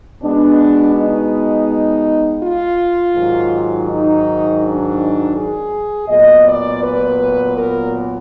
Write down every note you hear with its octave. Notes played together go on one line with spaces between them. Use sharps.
B2 G#3 B3 D4
D#4
F4
G#2 D#3 F#3
D#4
D4
G#4
A#2 F#3 B3 D#5
D5
B4
A#4